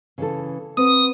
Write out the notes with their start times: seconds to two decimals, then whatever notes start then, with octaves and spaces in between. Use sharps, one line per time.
0.18 C#3 E3 A4
0.77 B3 C4 B4 D#6